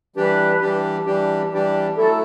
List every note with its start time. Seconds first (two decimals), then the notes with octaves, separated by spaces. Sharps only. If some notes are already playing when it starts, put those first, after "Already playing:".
0.16 E3 G3 D4 G4 B4
0.61 E3 G3 D4 G4
1.06 E3 G3 D4 G4
1.52 E3 G3 D4 G4
1.96 F#3 A3 E4 A4